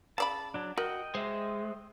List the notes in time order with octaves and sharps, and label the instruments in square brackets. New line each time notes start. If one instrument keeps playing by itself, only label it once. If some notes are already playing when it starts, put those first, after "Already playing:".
[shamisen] C#3 D5 B5 [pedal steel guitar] A5
[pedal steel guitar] F#3 D4
[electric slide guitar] F#4 [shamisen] A#4 [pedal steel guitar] D#5 G5
[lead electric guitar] G#3 [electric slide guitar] C5 E5